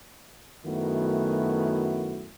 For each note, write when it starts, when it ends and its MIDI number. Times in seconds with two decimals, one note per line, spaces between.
0.65 2.29 42
0.65 2.29 51
0.65 2.29 57
0.65 2.29 59
0.65 2.29 64
0.65 2.29 66